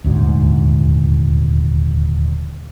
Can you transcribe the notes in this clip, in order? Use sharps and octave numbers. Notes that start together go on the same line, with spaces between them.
D#1 D2 G#2